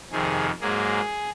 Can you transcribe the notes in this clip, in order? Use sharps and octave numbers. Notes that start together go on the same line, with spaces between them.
F2 C3 D#3 G#4
G#2 F#3 A#3 G#4